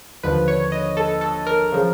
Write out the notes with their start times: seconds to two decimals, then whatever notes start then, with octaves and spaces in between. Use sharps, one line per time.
0.23 D#2 D3 F3 B4
0.48 C#5
0.72 D#5
0.97 A4
1.21 A4
1.47 A#4
1.72 C#3 F3